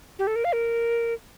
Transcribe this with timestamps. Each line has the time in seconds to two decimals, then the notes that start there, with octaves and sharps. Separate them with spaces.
0.19 G4
0.27 A4
0.36 A#4
0.45 F5
0.53 A#4